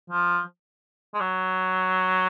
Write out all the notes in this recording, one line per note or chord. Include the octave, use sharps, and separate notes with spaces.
F3
G#3
F#3